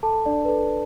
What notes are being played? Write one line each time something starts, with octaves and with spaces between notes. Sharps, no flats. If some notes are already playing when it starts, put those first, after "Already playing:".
A4 A5
D4 D5
B4
A4